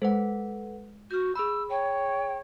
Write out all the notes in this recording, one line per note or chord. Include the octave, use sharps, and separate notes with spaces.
G#3 A4 B4 C5 F#5
F#4 F6 G6
G#4 B5 E6
C#5 G5